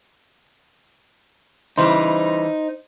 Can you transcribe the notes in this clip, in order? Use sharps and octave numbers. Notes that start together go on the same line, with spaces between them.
C#3 E3 G3 D#4 C5